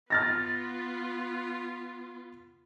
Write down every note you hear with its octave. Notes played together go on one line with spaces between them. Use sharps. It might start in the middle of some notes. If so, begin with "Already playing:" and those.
B3 F4 F6 A6 A#6